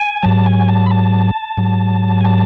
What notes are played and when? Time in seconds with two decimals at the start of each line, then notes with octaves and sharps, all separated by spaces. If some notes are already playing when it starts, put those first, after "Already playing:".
Already playing: G#5
0.23 G#2 F#3 A5
0.46 G#5
0.68 A5
0.86 B5
0.91 A5
1.57 G#2 F#3
2.21 G#5
2.25 A5